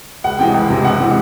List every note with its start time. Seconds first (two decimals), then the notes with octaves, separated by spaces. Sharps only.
0.24 C#2 F#5
0.39 C3 E3 G#3 G5
0.54 C#2
0.70 C3 E3 G#3
0.84 C#2 F#5
1.00 C3 E3 G#3